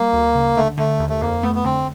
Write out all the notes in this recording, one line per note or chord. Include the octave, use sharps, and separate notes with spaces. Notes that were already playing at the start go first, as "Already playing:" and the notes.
Already playing: G3 A#3
D2
C#3
D3 A3
D3 A3
D#2
A3
F2 A#3
A3 B3
B3
D3 C4